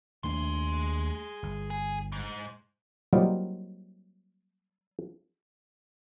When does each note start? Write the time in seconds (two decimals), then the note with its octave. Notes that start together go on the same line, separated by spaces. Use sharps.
0.24 D#2 A3 D4 G#4 C6
1.43 G1
1.70 G#4
2.12 G#2
3.13 F#3 G3 A#3 C4 D#4 F4